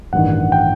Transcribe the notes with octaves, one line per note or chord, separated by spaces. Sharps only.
A1 G2 D#3 F#5
G5